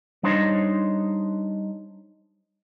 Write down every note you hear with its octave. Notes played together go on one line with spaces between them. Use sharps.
G3 D4 D#4 C5 C#5 D#5